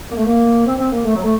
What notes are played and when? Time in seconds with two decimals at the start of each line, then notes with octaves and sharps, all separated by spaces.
0.11 A#3
0.17 A3
0.27 A#3
0.66 C4
0.78 C4
0.92 A#3
1.05 A3
1.15 F#3
1.24 A3